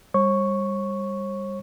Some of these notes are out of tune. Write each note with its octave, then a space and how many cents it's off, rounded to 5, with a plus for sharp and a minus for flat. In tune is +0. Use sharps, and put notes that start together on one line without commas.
G3 +25 C#5 -45 C#6 +0